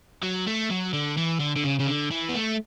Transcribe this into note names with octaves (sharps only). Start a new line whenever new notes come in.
F#3
A3
F#3
D3
E3
D3
D3
C#3
C#3
D3
E3
B3
A3